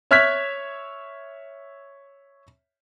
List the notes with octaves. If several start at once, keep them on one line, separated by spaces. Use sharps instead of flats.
C#5 E5 F6 F#6 G#6 B6